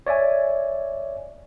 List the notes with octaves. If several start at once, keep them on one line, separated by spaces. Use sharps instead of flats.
C#5 D5 E5 G#5